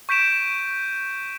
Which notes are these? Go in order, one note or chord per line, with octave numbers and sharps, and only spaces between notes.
C#6 G6 B6 D7 E7